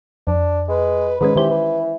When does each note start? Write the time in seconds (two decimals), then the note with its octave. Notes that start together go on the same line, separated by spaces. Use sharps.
0.27 F2 D4
0.68 G#3 B4
1.21 G#2 D#3 G#3 C#4 B4
1.36 D#3 E3 G4 C5
1.51 B4